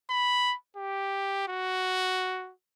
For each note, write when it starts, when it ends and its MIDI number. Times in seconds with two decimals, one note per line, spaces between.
0.10 0.55 83
0.77 1.46 67
1.48 2.52 66